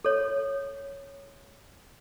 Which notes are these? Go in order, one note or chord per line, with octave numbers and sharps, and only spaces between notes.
A4 C#5